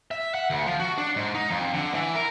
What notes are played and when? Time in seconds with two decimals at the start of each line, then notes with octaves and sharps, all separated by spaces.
0.11 E5
0.35 F#5
0.50 D2
0.67 F3
0.80 F#4
0.98 D4
1.16 G#2
1.35 D#4
1.51 F2
1.73 D3
1.94 E3
2.15 A#4